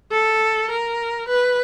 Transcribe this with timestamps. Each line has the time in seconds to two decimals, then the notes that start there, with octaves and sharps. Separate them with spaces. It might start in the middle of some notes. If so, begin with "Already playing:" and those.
0.11 A4
0.70 A#4
1.28 B4